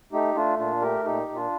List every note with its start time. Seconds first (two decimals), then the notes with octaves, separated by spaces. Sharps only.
0.12 A3 D#4 G4
0.35 A3 D4 F4
0.59 A#2 D4 F4
0.82 A3 G4 A#4
1.05 A#2 D#4 G4
1.29 A#2
1.36 D4 F4